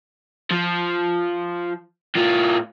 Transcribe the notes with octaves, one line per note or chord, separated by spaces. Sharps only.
F3
A2 F4